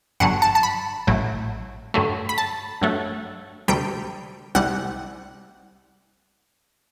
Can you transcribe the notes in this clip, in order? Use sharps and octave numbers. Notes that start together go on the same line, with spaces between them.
G1 G2 D3 F#3 F#5
A5
A5
B5
A1 A2 F#3 A3
G2 D3 F#3 A3
B5
A5
G2 F#3 A3
D2 C3 G3 G5
C2 C3 G3 F#5